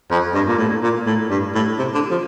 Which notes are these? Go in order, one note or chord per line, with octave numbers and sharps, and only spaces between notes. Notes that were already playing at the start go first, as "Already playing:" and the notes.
F2
G2
A#2
A2
A#2
A2
G2
A2
C3
D3
F3